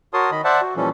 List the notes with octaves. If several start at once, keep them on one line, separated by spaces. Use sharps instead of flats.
F#4 A#4 C#5 A5 C6 D#6
D#3 D#5 B5
C5 D5 E5 F#5 A5
F#4
A#2 E3 F3 G3 C#4 A4